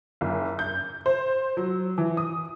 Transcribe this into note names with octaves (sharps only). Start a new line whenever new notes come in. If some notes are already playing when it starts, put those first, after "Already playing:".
F#1
G6
C5
F#3
E3
D#6